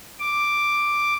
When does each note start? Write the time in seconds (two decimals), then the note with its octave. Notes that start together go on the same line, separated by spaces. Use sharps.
0.20 D6